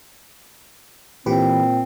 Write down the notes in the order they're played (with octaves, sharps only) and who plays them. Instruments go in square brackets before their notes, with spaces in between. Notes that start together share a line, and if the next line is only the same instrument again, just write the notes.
[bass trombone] A#2 [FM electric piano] E3 G4 B4 [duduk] C4